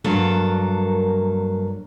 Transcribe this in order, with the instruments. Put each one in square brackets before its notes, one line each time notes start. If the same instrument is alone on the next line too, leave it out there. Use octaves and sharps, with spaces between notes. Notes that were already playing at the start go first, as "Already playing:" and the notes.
[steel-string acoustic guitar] G2 F#3 A#3 A4 A#4